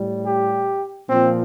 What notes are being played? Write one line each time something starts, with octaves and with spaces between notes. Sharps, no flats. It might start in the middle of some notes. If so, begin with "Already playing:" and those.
Already playing: A2 G3
G4
A#2 F3 C4